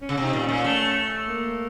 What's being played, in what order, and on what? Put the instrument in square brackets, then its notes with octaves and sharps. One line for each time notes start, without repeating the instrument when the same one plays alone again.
[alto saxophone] C#4
[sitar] C#3
[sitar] C3 [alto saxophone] D#4
[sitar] A#2
[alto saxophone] C#4
[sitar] A#2
A3
[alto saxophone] A#3